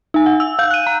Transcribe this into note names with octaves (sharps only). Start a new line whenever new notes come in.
D#4 G#5
F#5
E6
F5 G6
F#6 D#7
A#5